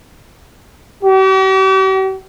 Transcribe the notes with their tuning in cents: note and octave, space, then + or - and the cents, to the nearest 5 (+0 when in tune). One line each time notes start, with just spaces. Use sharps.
G4 -45